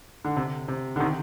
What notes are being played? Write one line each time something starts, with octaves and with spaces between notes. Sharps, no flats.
D3
C3
C3
D3
C3 D#3